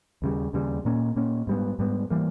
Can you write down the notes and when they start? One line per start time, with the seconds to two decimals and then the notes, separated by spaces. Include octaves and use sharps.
0.22 D#2 C#3 G3
0.53 D#2 C#3 G3
0.85 A#2 A#3 C#4
1.16 A#2 A#3 C#4
1.47 G#2 G3 B3
1.79 G#2 G3 B3
2.10 E3 G3 A#3